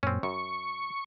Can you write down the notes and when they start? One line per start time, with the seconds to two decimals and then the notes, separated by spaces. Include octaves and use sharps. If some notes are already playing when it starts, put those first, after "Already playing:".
0.03 F#2 A#2 C4 C#4
0.23 F#2 C#6